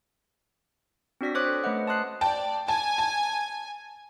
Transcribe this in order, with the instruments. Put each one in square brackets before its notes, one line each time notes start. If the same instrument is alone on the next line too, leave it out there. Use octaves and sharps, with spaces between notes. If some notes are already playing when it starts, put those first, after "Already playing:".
[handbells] C4 D4 F#4 D5 A#6 B6
C5 C#5 D6 D#6 F#6
A4
A3 C#4 B4 C5 D#5 F#5
A5 C6 D#6 F#6 C7
[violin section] D5 [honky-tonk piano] G5 A5
[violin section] G#5 [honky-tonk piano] A5
[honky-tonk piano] A5